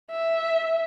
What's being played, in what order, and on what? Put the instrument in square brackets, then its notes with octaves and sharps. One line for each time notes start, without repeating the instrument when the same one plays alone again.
[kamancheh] E5